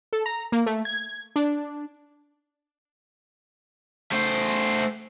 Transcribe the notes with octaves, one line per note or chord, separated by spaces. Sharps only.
A4
A#5
A#3
A3
G#6
D4
A3 C5